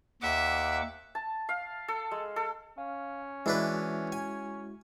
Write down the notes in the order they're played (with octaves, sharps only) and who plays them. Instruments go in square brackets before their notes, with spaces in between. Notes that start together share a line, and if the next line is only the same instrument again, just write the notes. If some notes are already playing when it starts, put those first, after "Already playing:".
[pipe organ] D#2 F#5 D6 [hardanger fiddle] E5
[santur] A5
F5
A4
G#3
A4
[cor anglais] C#4 [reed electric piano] F5
[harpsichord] E3 D4 B4 [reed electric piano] G#3 E4 F#4
[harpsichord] G#5